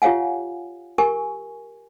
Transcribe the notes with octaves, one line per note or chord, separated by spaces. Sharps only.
F4 G4 C#5 F5 F#5 G#5
G4 A#4 G#5 C#6